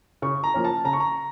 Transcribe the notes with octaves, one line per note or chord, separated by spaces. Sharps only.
C#3 C#6
A#5
F3 A#3 C#4
A5
C#3 A#5
C#6
A#5